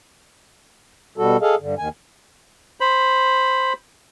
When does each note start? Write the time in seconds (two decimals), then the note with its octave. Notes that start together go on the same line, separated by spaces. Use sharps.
1.18 B2 G3 F#4 A4
1.41 G#4 A4 D#5 F5
1.60 G2 D3
1.78 D#2 D#3 G#5
2.80 C5 B5